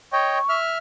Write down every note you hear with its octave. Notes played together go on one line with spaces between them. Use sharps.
C#5 D#5 G5 C#6
E5 F6